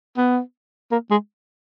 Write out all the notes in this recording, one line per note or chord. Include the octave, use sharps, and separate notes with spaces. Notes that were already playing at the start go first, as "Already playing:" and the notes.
B3
A#3
G#3